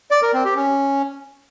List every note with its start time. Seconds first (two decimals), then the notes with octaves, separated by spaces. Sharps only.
0.11 D5
0.22 A#4
0.34 C4
0.45 G4
0.56 C#4